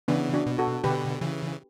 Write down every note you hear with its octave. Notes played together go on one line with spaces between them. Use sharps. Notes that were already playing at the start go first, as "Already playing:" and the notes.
C#3 E3 B3 D4
D4 F#4
B2
F#4 A4
B2 D3 G4 B4
C#3 E3